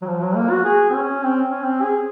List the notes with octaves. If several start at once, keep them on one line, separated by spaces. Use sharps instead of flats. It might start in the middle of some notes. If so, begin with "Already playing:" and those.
F#3
F3
F#3
A#3
F#4
G#4
C4
C#4
C4
C#4
C4
G#4